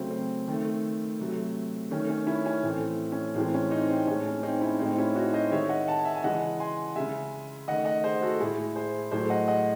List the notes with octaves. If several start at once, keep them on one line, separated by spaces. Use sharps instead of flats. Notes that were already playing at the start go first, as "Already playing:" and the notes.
Already playing: C#3 F#3 A3 C4
C4
D#3 A3
C3 F#3 A3
D#3 A3 C#4
C#4
C#4 E4
C#4
A2 E3 A3 C4
C#4
A2 E3 G#3 C4
C#4
C4 D#4
C4
A2 G#3 C#4
C#4
C4 D#4
C#4 E4
A2 G#3 C4 D#4
C#4 E4
D#4 F#4
C5 D#5
D#3 G#3 C#5 E5
D#5 F#5
F#5 A5
E5 G#5
G#5
C#3 E3 G#3 D#5 F#5
G#5 C6
C#3 G#3 E5 G#5
D#3 A3 D#5 F#5
D#5 F#5
G#4 C5
F#4 A4
A2 G#3 E4 G#4
G#4 C5
A2 F#3 A3 G#4 C5
D#5 F#5
D#5 F#5